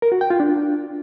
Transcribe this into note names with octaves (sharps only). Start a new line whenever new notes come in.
A#4
F#4
G5
F4
D4